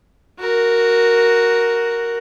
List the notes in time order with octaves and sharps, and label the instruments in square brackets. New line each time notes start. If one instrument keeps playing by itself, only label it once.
[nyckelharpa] F#4 A#4